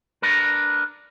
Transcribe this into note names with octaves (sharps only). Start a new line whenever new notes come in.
D4 A#4 B4